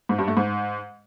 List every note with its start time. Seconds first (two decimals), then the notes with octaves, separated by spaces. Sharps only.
0.09 G#2
0.18 G2
0.28 A3
0.37 G#2